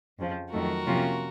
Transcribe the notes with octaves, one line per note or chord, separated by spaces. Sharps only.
F2 C#3 F3
F2 D#3 F#3 A3 F#4 A#4
C3 F3 A#3 C#4 F4